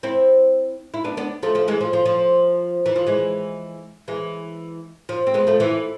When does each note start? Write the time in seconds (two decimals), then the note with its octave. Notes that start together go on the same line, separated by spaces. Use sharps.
0.03 C4 E4
0.94 E4
1.04 B3 D4
1.17 B3 D4
1.43 F3 A3
1.55 F3 A3
1.68 E3 G#3
1.81 F3
1.93 F3
2.05 F3
2.86 E3
2.96 F3
3.07 E3 G#3
4.08 E3 G#3
5.09 F3
5.27 C4
5.34 G#3 B3
5.47 F3 A3
5.60 E3